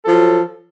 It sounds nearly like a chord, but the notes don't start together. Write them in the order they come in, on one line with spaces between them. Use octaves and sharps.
A4 F3 F#3